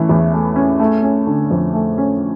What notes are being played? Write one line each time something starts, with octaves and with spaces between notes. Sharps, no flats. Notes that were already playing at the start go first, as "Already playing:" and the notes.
Already playing: E3 A3 C#4
E2
A3
C#4
A3
C#4
D3
F2
A3
C#4